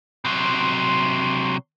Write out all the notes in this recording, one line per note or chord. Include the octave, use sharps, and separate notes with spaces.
C3 F#3 C6